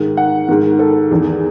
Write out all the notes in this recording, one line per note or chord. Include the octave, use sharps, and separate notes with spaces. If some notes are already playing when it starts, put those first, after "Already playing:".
Already playing: G#2 D#3
F#5
G#2 D#3
A4
E2 D#3